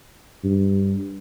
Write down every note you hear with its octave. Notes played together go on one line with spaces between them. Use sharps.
G2